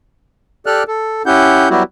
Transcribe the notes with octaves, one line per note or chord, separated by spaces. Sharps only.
G4 A4 D5 F6 F#6
A4
C#4 E4 G4 F#5 G6
F#3 G3 B3 E4 F#4 G4